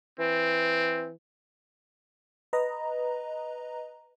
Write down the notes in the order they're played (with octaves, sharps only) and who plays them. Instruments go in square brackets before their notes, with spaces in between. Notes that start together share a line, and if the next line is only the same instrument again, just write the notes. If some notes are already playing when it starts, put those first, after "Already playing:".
[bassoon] E3 [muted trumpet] C4
[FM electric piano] B4 D#5 A#5